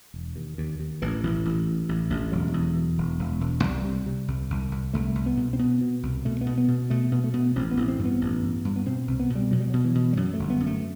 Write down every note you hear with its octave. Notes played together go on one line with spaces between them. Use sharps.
E1
D#2
D#2
D#2
A1 E3
A1
A1
A2
A1
A1
E1 F#3
E2
B2
E1
E1
E1
C2 G3
C3
C3
C2
C2
C2
C2 A3
C2
B3
B2
C4
B2 B3
B2
C2
B2 A3
B3
B2
B3
B2
B2 A3
B2 B3
A3
B2 B3
A1 C4
B3
A1
C4
G2
B3
A1
G2
G2
B3
B2 C4
C2
B3
B2
G3
B2 F#3
G3
B2 F#3
E3
B2
G3
F#2 F#3
A3
G1
B3
F#2
A3